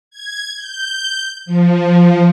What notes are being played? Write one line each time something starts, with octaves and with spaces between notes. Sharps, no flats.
G#6
G6
F3